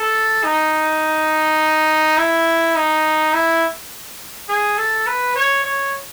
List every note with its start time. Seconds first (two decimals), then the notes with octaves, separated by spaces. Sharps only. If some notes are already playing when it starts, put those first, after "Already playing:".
Already playing: A4
0.44 D#4
2.17 E4
2.75 D#4
3.33 E4
4.49 G#4
4.78 A4
5.06 B4
5.35 C#5
5.64 C#5